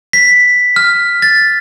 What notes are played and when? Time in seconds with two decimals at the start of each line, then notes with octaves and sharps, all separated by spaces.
0.13 B6
0.76 F6
1.22 A6